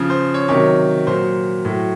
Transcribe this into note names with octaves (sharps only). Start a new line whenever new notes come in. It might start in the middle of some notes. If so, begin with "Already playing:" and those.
Already playing: C#3 F3
C5
C#5
C3 D#3 F#3 C#5
A#2 F#3 C5
A2 F#3